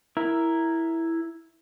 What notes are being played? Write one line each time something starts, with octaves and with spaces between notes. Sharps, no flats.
E4 A#4